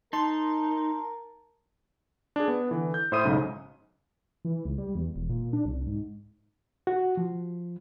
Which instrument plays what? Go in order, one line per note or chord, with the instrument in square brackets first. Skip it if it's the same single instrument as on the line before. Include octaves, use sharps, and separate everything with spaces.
[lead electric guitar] D#4 [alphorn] A#4 [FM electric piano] A5 C6
[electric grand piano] D4 G#4
B3
D3 E3
G6
A2 C5 E5 D#6 D#7
B1 G#2 C#3
[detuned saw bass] E3
C#2
G3
E2
E1
A#2
D4
C2
G#2
[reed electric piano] F#4
F3